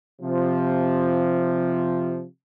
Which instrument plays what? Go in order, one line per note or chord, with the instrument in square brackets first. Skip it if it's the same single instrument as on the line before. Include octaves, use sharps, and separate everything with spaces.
[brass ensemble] C3 F3